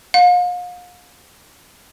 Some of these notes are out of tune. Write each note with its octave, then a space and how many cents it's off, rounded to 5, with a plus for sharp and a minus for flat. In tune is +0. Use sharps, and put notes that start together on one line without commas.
F5 +40